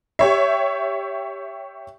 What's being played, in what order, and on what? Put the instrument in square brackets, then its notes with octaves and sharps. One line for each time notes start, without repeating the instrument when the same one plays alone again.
[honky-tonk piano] G4 C#5 E5